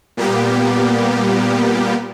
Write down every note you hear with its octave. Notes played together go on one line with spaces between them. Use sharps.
A#2 G3 A#3 B3 G4